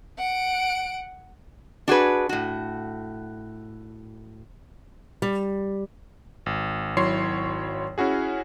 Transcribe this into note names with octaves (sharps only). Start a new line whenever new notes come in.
F#5 D7
D4 F#4 G#4 B4
A2 F#4
G3
G#1
G#1 F#3 E4 C#5 C6 C7
C#4 E4 F#4 G#4